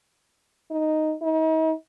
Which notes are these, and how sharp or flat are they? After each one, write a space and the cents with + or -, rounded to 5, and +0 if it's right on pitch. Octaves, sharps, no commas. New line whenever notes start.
D#4 +0
D#4 +40